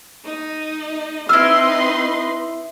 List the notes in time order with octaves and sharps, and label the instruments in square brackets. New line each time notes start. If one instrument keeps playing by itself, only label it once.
[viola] D#4 D#5
[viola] C4 D#4 [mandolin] E4 F6 [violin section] B4 D#5 C6 [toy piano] E6